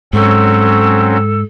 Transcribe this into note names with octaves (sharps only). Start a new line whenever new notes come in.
G#2 F#3 C4 C#4 A4